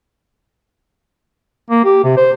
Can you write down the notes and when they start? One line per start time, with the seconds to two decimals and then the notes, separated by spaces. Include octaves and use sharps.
1.70 A#3
1.85 G4
2.04 C3
2.17 C5